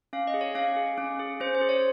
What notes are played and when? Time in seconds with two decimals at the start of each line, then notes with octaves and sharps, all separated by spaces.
0.13 C#4 F5
0.27 D#5
0.34 G#4
0.41 C#5
0.55 C#4 F5
0.76 G#4
0.98 C#4
1.19 G#4
1.40 C#4 C5
1.55 C5
1.61 G#4
1.69 C#5